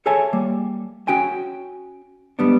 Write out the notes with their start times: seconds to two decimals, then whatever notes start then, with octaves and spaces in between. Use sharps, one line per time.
0.06 G#4 A4 C#5 E5 G#5 A5
0.33 G3 A#3
1.08 C#4 F#4 G5 G#5
2.39 G#2 G3 B3 D4